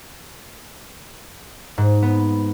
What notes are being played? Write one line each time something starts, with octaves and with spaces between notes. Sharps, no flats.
G#2
B3